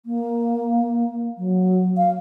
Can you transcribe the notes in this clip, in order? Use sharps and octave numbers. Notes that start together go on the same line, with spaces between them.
A#3
F#3
F5